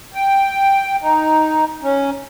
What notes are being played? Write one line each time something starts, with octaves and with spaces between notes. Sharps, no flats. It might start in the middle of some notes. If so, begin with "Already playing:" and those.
G5
D#4
C#4